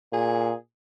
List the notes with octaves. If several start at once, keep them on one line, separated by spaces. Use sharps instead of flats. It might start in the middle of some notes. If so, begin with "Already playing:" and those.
A#2 G#4